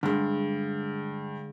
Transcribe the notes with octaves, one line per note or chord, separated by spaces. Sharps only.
G2 D3 G#3